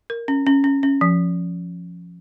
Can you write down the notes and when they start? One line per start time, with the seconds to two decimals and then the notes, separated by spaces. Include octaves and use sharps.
0.10 A#4
0.28 C#4
0.46 C#4
0.64 C#4
0.83 C#4
1.01 F3